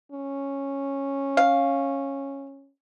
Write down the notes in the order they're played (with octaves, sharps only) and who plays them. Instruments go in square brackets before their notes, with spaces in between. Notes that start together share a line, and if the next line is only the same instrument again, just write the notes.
[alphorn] C#4
[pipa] F5